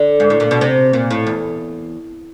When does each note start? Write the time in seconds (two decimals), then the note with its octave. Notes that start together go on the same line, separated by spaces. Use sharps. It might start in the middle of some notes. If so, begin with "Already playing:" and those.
Already playing: D3
0.20 G#2
0.30 A2
0.40 A#2
0.51 B2
0.61 C3
0.93 A#2
1.11 A2
1.27 E2